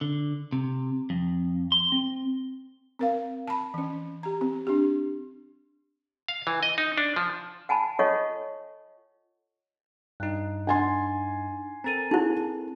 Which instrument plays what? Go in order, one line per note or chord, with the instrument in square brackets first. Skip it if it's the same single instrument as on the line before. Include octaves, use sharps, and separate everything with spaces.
[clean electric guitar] D3
C3
F2
C6
C4
[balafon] C4 A#4 F5
A5 B5
E3 C#4
G4 A#5
C4
D4 G4
[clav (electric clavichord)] F5
E3
D#5
D#4
D4
F3
[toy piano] F#5 G#5 A5 B5
F4 A4 C#5 D#5 F#5 C#6
[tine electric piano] G2 D#4 [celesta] F#6
[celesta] D4 A6 [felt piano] F#5 G#5 C6
[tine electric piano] C4 A4 A#4 [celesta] A#5 A6 D#7
[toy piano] D#4 E4 [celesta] G#4